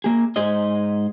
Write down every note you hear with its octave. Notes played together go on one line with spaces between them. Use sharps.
A#3 G#4
G#2 G#4 C5 D#5